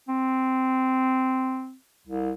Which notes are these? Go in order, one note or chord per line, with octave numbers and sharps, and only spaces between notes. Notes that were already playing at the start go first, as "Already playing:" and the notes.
C4
C2